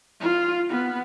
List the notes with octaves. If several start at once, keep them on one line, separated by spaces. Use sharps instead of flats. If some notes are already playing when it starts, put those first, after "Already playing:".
F4
B3